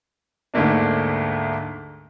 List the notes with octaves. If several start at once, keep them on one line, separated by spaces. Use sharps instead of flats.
D2 G#2 A3 A#3 D4